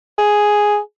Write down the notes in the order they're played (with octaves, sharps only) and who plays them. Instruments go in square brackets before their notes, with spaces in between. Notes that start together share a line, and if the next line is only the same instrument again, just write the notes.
[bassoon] G#4